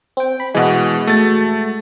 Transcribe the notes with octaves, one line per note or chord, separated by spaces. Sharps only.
C4 G5
B5
B2 E3 G#3 F#4
A3 A6